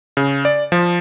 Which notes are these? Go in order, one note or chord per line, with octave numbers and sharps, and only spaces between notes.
C#3
D5
F3